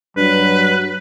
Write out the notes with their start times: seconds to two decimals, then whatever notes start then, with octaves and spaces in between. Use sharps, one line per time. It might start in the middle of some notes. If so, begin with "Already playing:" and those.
0.17 G2 F#3 B4